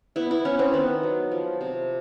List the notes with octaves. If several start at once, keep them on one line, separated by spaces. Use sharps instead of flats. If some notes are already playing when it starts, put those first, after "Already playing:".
B3 E4
E4
B3 C#4
C4
D#3 B3
F#3
F3
C3